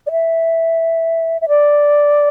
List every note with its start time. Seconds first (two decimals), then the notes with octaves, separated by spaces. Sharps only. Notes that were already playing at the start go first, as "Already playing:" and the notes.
0.07 D5
0.11 E5
1.41 E5
1.49 D5